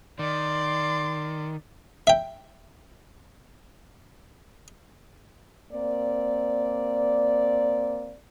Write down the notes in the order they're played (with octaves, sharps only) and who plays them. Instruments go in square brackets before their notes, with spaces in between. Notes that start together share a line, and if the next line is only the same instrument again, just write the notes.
[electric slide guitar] D#3 [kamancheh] D5 C6
[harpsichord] E5 G5
[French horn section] A#3 C4 D5